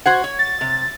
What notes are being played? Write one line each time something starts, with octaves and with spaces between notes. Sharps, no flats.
F#4 C5 F#5 G#6
C#5
A6
C3